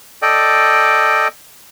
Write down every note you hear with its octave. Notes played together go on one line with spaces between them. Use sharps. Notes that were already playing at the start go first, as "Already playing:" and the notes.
A4 D5 D#5 G5